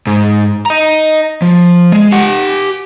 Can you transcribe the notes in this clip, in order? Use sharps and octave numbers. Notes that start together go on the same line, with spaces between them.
G#2
D#5 A#5
F3
G#3
G4 F#5